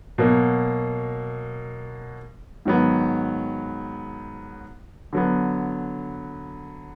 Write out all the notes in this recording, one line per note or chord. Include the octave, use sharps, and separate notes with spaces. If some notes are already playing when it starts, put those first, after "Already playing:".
B2 F#3 A#3
G#2 D#3 F#3 B3
D3 F#3 B3